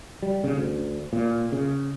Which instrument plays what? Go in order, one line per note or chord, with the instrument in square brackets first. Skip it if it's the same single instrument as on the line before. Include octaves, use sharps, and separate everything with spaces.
[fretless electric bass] G3
C#3
D2
A#2
C#3